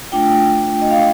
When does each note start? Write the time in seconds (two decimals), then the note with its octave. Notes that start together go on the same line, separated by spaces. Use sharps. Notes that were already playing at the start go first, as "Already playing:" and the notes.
0.12 A3 D4 F4 G5
0.82 D#5
0.91 F5